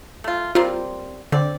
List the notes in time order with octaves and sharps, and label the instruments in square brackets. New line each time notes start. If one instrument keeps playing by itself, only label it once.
[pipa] A3 F4
[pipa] G3 A#3 C4 [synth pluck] F4
[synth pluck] D3 [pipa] C4 D5